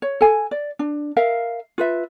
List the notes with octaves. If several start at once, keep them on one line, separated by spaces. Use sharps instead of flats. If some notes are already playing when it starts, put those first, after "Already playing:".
C#5
A4 G#5
D5
D4
A#4 E5 F5
F4 B4 E5